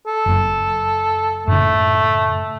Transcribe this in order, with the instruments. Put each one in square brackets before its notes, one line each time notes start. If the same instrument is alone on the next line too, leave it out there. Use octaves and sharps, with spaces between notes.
[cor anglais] A4
[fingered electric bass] F#1 F#2
[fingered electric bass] F#2 A2 C#3 [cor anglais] A3